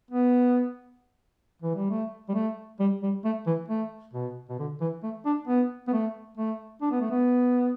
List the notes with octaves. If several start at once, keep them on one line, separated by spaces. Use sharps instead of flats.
B3
E3
G3
A3
G3
A3
G3
G3
A3
E3
A3
B2
B2
D3
E3
A3
D4
B3
B3
A3
A3
D4
B3
A3
B3